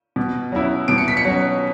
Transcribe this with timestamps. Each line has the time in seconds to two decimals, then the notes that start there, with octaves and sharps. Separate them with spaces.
0.16 B2
0.52 F#3 C#4 E4
0.88 B2 D7
0.98 C#7
1.08 B6
1.17 C#7
1.25 F#3 C#4